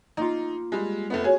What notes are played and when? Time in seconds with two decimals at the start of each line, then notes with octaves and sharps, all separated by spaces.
0.17 A#3 D#4 F4
0.72 G3 G#3
1.10 F1 A3 B3
1.24 F#4 G#4 C#5